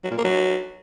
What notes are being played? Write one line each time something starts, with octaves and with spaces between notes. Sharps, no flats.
F#3
A#2
A#3
F#3